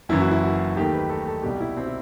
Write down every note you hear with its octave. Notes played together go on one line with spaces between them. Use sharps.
F#1 F#2 E3 E4
F#4
E4
F#4
D#2 D#3 A3 G4
B4
A4
A4
C2 B2 G3 G4
E4
C4
E4